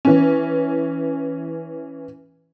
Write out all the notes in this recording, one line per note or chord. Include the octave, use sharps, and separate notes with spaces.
E3 C#4